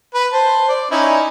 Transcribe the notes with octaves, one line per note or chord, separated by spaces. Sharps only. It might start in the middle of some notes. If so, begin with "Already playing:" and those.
B4
C5 A5
D5
C#4 D#4 E4